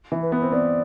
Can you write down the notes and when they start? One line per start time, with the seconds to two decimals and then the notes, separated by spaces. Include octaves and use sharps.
0.12 E3
0.23 B4
0.32 B3
0.42 C4
0.52 B3 D5